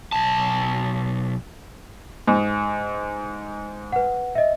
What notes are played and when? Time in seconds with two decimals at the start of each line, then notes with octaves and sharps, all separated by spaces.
0.12 B1 A5
2.28 G#2
3.92 B4 F#5
4.35 D#5 E5